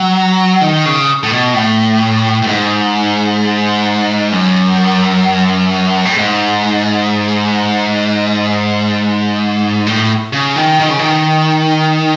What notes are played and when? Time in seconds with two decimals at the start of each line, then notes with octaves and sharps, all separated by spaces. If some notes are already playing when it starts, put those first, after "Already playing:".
Already playing: F#3
0.61 D#3
0.85 C#3
1.23 A2
1.32 B2
1.54 A2
2.42 A2
2.47 G#2
4.32 F#2
6.05 A2
6.17 G#2
9.87 A2
10.33 C#3
10.56 D#3
10.80 D#3
10.89 C#3
10.99 D#3